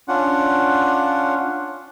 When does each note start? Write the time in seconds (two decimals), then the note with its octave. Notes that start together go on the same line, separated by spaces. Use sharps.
0.08 C#4 D4 F4 F#5